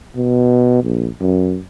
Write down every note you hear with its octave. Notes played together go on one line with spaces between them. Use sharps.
B2
A#1
F#2